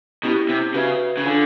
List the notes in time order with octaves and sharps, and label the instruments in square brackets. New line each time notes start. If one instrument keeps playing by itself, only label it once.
[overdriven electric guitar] B2 [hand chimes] C#4 E4 G4
[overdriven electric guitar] C3
[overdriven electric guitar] C#3 [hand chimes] F#4 B4 E5
[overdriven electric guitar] C#3
[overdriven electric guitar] D3 [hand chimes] F4 A4 C#5 F5 G#5